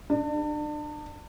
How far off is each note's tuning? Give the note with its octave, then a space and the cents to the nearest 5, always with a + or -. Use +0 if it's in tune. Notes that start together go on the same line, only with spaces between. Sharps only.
D4 +35